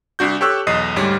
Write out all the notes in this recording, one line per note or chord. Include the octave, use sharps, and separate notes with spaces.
C2 D4 F#4 G6
G4 A4 C#5 C#6 E6 F#6
B1 E2 D#5 D#6 C7
D2 G#2 G3 C#5